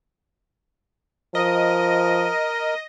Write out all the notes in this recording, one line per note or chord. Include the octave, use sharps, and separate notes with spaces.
F3 A#4 D#5